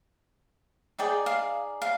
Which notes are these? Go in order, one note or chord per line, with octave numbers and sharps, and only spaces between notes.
D#4 G#4 D5 G5
F5
F5